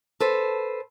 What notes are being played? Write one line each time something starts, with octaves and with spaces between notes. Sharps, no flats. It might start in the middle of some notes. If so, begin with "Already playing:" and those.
A4 B4 C5